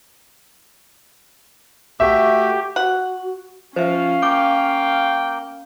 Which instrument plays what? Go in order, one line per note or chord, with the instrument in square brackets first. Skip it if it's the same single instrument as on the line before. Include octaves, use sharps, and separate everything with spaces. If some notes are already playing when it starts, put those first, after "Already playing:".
[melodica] A3 F#4 [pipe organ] G4 [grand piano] E5
[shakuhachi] F#4 [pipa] F#5
[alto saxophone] F3 [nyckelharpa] C#4 F5 [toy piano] C5 E5
[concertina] A#3 [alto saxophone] G5 [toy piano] D6